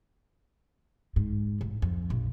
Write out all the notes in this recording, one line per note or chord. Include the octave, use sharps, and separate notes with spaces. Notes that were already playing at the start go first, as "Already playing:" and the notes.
G#2
A1
F2
A#1